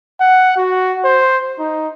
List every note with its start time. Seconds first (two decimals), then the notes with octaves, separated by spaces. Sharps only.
0.20 F#5
0.57 F#4
1.04 C5
1.59 D#4